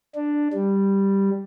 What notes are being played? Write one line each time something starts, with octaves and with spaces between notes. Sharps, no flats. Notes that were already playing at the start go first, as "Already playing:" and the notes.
D4
G3